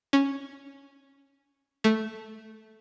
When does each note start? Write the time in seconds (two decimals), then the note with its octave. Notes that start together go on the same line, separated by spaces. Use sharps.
0.13 C#4
1.84 A3